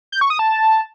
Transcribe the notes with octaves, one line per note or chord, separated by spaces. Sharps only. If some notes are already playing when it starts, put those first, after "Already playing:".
G6
C#6
D#6
A5